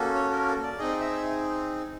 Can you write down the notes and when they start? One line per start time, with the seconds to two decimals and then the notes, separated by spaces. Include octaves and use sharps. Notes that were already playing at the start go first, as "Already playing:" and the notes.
Already playing: A#3 C#4 F#4 A4
0.15 C#5
0.31 A#4
0.47 A4
0.63 D5
0.79 C4 D#4 G#4 D#5
1.00 E5